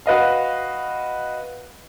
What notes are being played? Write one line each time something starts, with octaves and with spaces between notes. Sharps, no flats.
F#4 B4 D#5 F5